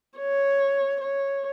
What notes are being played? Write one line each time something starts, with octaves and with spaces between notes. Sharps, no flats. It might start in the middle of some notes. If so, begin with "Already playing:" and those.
C#5
C#5